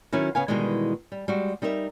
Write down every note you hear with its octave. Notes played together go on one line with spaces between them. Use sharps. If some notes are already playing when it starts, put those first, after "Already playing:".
D#3 F#3 C#4 E4 F#4
C#3 B3 F5 G#5
B2 D#3 E3 G3 G#3
G3
G3 G#3 F#4
G3 D#4 A#4 C5 E5